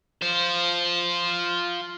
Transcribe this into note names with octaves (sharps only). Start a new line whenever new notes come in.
F4 C5